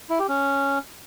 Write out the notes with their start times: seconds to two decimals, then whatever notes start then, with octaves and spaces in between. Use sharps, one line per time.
0.10 E4
0.19 G4
0.28 C#4